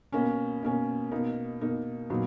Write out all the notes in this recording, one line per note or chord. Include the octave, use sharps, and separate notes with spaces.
B2 A#3 C#4
B2 A#3 C#4
B2 A#3 D#4
B2 A#3 D#4
A#2 F#3 B3 D#4